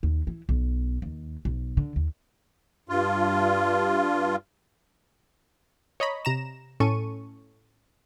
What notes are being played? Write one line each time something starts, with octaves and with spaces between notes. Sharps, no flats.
D#2
E3
B1
D#2
B1
D3
D#2
G2 F4
C#5 D#5 A#5 B5
C3 A#5 E7
A2 C#4 A4 C#6 D#7